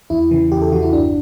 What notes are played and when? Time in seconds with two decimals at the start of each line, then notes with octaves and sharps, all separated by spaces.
0.10 E2 E4
0.31 C#3 E3
0.52 E2 G4
0.62 A4
0.72 C#3 E3 F#4
0.82 E4
0.93 G1 D4